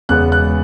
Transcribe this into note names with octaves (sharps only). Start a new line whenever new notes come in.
E1 E2 C#3 G#3 B3 F#6
F#6